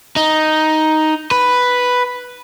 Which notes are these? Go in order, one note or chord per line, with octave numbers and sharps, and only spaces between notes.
D#4
B4